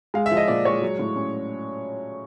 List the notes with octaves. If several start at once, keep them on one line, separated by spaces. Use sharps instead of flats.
G#3 F5
E5
F3
D#5
A#2 D5
G#3 C#5
F#3
A2
C#4